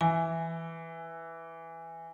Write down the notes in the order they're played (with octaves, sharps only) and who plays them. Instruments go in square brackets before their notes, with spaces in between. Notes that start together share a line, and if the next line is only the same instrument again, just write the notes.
[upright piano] E3 [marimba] G#5